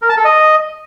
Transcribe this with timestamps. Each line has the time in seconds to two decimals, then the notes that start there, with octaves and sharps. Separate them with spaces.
0.02 A#4
0.09 A5
0.17 A4
0.25 D#5